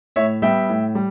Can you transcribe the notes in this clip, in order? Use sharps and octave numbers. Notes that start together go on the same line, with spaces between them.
A2 C#5 E5
G3 B3 E5 G5
A2
G3